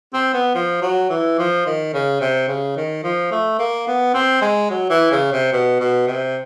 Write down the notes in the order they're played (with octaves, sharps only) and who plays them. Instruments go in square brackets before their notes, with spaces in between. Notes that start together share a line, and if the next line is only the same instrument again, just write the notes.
[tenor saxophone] C4
B3
F3
F#3
E3
F3
D#3
C#3
C3
C#3
D#3
F3
A3
A#3
B3
C4
G#3
F#3
E3
C#3
C3
B2
B2
C3